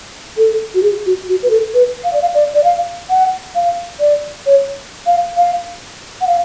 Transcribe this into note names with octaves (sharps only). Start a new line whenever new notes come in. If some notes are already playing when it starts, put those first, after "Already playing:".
A4
F#4
G#4
F#4
F#4
B4
A4
B4
F5
D5
F5
D5
D5
F5
F#5
F5
D5
C#5
F5
F5
F#5
F5